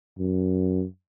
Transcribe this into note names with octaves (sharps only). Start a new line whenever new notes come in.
F#2